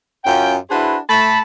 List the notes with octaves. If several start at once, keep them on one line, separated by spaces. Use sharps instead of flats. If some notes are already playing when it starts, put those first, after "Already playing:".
F#2 C#4 F4 G5
D4 E4 F#4 G#4 B4 C5
A3 A5 B5